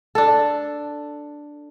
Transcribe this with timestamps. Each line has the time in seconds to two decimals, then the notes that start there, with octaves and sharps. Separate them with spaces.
0.15 D4 A4